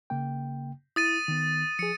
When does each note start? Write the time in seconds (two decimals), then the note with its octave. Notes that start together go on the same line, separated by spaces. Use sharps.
0.10 C#3 A#3 G5
0.96 E4 D#6 A6 D#7
1.28 D#3 B3
1.79 F3 G#4 C#7